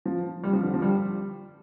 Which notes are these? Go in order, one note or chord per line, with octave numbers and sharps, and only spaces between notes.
F3
G3
F3
D3
F3
G3